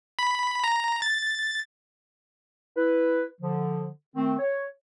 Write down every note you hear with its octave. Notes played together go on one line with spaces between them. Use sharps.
B5
A#5
A6
E4 B4
D3 F3
D#3 A3 C4
C#5